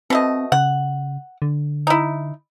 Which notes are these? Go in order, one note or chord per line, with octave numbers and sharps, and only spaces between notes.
B2 A3 C4 D#5
C#3 F#5
D3
D#4 E4